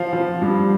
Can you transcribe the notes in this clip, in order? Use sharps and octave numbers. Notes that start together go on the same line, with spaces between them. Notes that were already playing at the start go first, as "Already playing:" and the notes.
Already playing: F3 F5
F3
G2